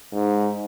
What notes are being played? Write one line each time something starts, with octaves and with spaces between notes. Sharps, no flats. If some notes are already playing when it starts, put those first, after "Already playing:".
G#2